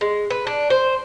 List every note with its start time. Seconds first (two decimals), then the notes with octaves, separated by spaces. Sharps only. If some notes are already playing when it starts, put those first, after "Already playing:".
0.01 G#3
0.30 B4
0.47 D4
0.70 C5